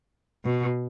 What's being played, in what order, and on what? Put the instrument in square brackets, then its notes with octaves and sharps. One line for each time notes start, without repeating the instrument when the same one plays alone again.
[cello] B2